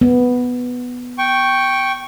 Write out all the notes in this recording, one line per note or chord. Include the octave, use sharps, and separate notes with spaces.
B3
G5 C#6